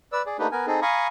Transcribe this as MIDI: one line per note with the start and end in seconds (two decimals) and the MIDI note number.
0.12 0.22 71
0.12 0.22 74
0.12 0.22 88
0.26 0.37 68
0.26 0.37 74
0.39 0.47 57
0.39 0.47 58
0.39 0.47 62
0.39 0.47 63
0.39 0.47 67
0.39 0.47 71
0.52 0.66 59
0.52 0.66 70
0.52 0.66 80
0.67 0.80 60
0.67 0.80 63
0.67 0.80 68
0.67 0.80 69
0.82 1.07 77
0.82 1.07 80
0.82 1.07 82
0.82 1.07 83
0.82 1.07 85
0.82 1.07 87